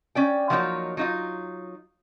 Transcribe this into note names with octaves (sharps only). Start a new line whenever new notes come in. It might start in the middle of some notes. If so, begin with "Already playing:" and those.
C#4 D5 G5
F3 F#3 A#3 D#4 C#5
F#3 D#4 F4